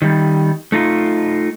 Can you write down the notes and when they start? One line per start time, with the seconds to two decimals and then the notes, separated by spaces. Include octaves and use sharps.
0.02 D#3 G3
0.72 A3 D#4 F4